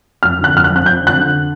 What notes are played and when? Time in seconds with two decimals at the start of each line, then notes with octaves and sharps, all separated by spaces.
0.23 F2 F6
0.39 D3
0.44 F#6
0.54 F2 F6
0.64 F#6
0.70 F2
0.76 F#6
0.85 F2 G6
1.01 D3
1.07 F#6
1.18 D3